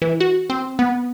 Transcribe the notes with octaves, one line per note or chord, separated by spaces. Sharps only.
E3
F#4
C4
B3